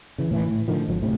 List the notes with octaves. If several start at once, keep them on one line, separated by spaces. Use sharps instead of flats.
C#3 E3
A2 D#3 E3
A2
A2 D3 D#3 F3
G#1 F3 F#3
D2 A2 C3